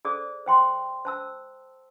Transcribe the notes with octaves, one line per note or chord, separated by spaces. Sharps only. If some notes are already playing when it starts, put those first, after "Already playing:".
G#4 A4 C5 D5 D#6
C5 G5 C6
C5 A5 E6